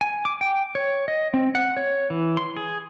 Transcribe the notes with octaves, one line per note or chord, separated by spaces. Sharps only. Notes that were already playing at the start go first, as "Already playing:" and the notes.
G#5
D6
G5
C#5
D#5
C4
F#5
C#5
E3
C6
G#4